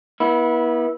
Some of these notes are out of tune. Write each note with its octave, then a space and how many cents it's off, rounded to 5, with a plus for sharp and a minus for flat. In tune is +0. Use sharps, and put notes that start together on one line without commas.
B3 -35 E4 -15